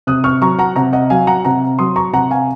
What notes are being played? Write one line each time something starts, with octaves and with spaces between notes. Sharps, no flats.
C3 D#6 F#6
C#6 F6
F#3 A#5 C#6
F#5 A#5
C3 F#5 A#5
D#5 F#5
F#3 F5 G#5
F#5 A#5
C3 F#5 A#5
F#3 C6 D#6
A#5 C#6
C3 F#5 A#5
F5 G#5